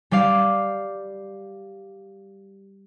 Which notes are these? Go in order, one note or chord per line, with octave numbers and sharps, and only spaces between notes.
G3 G4 D5 F5